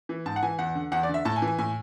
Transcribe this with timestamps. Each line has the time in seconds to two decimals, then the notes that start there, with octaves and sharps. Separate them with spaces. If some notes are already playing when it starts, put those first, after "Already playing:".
0.09 E3
0.26 G#2 A5
0.36 F#5
0.42 E3 G#5
0.59 E2 F#5
0.75 D3
0.92 E2 F#5
1.03 D5
1.09 D3
1.14 E5
1.25 A2 A5
1.36 G#5
1.42 E3
1.47 G#5
1.58 A2 G#5